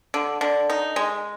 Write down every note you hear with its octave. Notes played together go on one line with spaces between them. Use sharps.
D3
D3
D#4
G#3